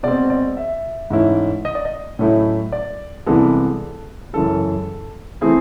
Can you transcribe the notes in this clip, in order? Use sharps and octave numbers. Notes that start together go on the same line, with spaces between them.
B2 G#3 C4 D5
D5
E5
G#2 E3 A3 C#4 E4
D#5
D5
D#5
A2 F#3 A3 C#4 E4
D5
C2 C3 E3 G#3 B3 A4
F#2 C#3 E3 G#3 A4
E3 A3 C4 E4 G#4